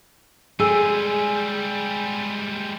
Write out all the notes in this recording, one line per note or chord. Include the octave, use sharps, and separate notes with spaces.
G3 G#3 G#4 G#5 E6 D#7